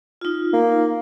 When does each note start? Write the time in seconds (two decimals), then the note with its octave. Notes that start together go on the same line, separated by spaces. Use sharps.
0.21 D#4 F4
0.53 A#3